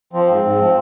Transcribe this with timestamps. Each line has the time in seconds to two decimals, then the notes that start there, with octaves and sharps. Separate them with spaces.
0.13 F3 C4
0.29 G#2
0.44 G#2
0.59 F3